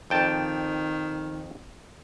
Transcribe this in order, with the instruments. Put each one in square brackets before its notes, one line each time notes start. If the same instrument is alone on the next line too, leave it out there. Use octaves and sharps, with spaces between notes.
[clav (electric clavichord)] F2 G5 A5 [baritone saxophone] D#3